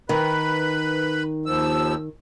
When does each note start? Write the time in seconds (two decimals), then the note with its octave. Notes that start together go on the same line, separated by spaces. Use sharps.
0.09 D#3 B4 B5
1.46 D#2 F3 E6